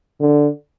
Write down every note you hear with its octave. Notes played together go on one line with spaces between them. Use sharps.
D3